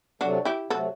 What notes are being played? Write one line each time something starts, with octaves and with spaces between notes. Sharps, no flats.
C3 F#3 A3 D4 F#4
E4 G4
C3 F#3 A3 F#4 A4